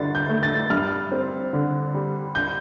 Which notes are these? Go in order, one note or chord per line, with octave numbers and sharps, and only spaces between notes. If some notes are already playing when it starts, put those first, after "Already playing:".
Already playing: G2 D3 A6
G6
A3
A6
G2 F6
C4
D3
G3
G6